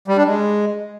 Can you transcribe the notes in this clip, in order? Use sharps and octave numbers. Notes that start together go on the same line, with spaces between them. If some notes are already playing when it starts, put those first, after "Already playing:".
G3
D4
G#3